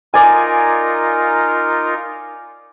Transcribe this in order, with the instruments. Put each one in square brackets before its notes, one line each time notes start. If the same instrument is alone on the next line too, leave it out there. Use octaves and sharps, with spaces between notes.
[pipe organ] D#4 F4 A#4 [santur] D5 G#5